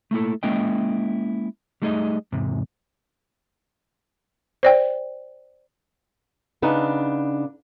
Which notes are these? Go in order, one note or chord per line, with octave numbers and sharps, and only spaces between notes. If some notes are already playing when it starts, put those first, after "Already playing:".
A3 A#3 E4 A4
G#3 A#3 C#4 E4 D#5 G5
G3 A3 D#4 G#4 D#5
E2 G#2 C3
C5 D5 G5
C#3 B3 D4 D#4